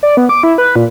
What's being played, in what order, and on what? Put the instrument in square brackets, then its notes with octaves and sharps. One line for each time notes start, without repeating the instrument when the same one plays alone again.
[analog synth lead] D5
B3
D6
E4
B4
A#2